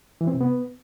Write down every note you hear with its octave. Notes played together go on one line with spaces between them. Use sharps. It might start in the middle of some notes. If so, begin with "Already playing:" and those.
E3
C4
C3
B3